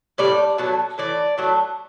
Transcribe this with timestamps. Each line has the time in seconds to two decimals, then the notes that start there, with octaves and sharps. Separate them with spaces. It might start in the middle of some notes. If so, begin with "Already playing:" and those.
0.18 A2 G3 D5
0.58 B2 F#3 A3
0.98 A2 E3 D5
1.38 A2 F#3 A3